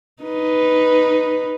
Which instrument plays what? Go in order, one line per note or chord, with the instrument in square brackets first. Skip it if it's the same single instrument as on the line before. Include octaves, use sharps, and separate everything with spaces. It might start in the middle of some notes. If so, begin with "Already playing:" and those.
[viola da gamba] D#4 B4